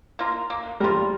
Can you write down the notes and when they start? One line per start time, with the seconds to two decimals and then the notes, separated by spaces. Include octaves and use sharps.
0.19 A#3 F4 A#4
0.50 A#3
0.80 G3 F4 A#4